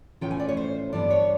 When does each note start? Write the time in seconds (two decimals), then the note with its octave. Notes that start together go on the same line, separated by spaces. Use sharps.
0.21 A2 E3 A3 C#4 F4 G5
0.31 G#5
0.40 D5
0.49 C#5
0.57 C5
0.92 G2 E3 G3 B3 D4 D5
1.10 C#5